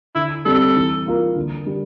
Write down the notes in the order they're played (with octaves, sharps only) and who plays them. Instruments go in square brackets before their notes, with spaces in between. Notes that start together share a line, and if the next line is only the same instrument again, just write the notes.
[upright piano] D3 [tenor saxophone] E4
[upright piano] G3 C4 [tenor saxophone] A4
[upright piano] E3
A#3 F4 A#4
D3
G3 D4